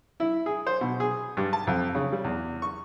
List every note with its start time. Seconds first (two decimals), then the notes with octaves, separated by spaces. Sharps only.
0.20 E4
0.46 G#4
0.67 C5
0.81 B2
1.00 G#4
1.37 G2
1.53 A5
1.67 F2
1.95 C#3
2.12 G3
2.24 E2
2.62 C#6